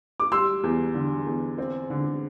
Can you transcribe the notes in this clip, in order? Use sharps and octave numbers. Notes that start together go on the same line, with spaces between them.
D6
G3 C6 E6
E2
D3
E2
C4
D3